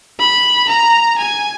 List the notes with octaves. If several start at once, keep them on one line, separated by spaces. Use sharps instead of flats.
B5
A#5
G#5